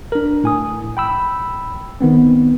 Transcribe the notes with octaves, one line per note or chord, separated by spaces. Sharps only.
D4 A#4
A2 G#5 D#6
G5 B5 E6
D#3 B3 C4